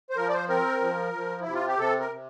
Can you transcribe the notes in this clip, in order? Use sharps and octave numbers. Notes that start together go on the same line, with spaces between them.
C5
F3 A#4
D5
C5
C4 A#4
F3
F3
C3 E4
F4
G4
C3 A4
A#4
C3